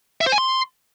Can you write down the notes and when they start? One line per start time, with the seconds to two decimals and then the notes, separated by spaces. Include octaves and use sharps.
0.21 E5
0.27 C5
0.32 G#5
0.38 C6